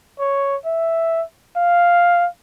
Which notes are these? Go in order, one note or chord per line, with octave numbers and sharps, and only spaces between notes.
C#5
E5
F5